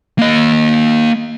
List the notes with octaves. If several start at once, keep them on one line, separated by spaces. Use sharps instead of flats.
A#3 D#5